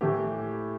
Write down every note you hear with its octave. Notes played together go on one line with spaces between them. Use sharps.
A2 E3 G4